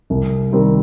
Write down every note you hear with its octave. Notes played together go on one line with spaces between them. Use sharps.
C2
C3 D#3 G3 C4